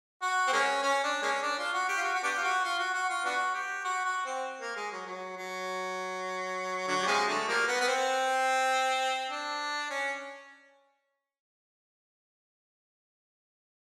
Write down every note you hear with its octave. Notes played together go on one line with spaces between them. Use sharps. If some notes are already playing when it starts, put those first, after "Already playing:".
F#4
C4
G#3 A#3 C#4
C#4
D4
G#3 A#3 C#4
D4
F4
F#4
G4
F4
F#4
F#4
B3 D4 G4
F4
F#4
F4
F#4
F#4
F4
B3 D4 F#4
G4
F#4
F#4
C4
A#3
G#3
F#3
F#3
F#3
D3 F#3
G3
C3 F3 G#3
D3 F#3 A3
F3 G3 A#3
B3
B3
C4
D4
C#4